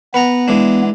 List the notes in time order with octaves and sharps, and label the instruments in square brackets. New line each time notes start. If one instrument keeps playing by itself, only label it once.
[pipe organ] B3 [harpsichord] B4 F#5 A#5
[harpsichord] E3 G#3 D4